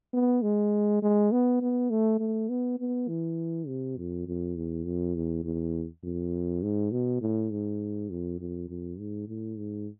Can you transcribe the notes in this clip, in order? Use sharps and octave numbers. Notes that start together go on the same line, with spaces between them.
B3
G#3
G#3
B3
B3
A3
A3
B3
B3
E3
C3
F2
F2
E2
F2
E2
E2
F2
G#2
B2
A2
G#2
F2
F2
F2
G#2
A2
G#2